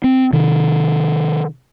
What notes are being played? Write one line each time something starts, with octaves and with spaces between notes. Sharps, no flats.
C4
C3 D#3